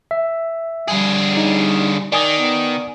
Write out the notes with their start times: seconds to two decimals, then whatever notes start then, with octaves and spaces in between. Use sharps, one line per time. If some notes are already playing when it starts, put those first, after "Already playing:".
0.11 E5
0.88 D3 G3 G#4
1.37 D#4
2.12 D#3 D5 G#5 D#6
2.37 B3